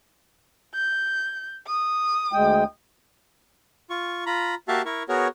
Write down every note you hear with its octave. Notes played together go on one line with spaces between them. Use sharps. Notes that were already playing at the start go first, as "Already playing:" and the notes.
G6
D#6
D2 G#3 G5
F4 C#6
F4 A#5 B5
A#3 F#4 G4 E5 F5 A5
E4 A#4 C#6
B3 F#4 G#4 A#4 C#5